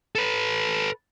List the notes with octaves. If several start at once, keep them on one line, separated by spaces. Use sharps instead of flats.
A4 B4